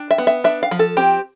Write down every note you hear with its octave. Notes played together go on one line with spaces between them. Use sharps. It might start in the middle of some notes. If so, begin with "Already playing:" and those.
Already playing: D4
E5
B3
E5
D4 E5
F5
F3
A4
C4 G4